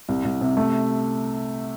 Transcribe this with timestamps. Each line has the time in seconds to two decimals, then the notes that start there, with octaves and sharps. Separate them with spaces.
0.09 C2
0.25 C2
0.41 C3
0.57 A3